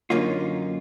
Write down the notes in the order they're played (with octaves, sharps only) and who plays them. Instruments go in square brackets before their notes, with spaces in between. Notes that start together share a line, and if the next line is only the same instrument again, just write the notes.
[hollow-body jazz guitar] F#2 D3 A#3 C#4 D#4 F4